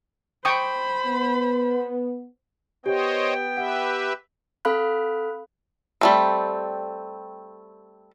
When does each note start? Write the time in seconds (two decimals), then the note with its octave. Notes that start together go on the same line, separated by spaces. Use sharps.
0.45 C5 G5 B5 C#6 D#6
1.06 B3
2.86 B3 G4 C5 C#5 D#5 G5
3.57 G4 B4 E5 F#5
4.65 C4 A4 F5 B5 F#6
6.01 G3 A3 C4